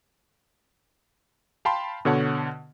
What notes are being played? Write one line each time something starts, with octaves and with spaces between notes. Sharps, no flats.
F5 G5 A5 B5 C6
B2 D3 C#5 F#5 A5